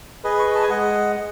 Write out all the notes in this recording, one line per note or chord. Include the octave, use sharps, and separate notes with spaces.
G#4 B4 D#5
C#6
B5
A5
G#5
G#3 D#5 F#5